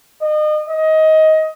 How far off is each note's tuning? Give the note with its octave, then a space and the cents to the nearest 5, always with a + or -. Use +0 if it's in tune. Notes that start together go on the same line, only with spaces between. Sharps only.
D#5 -35
D#5 +20